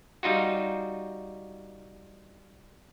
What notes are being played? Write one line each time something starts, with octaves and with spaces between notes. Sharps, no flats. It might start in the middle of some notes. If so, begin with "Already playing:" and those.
G3 D#4 F4 F#4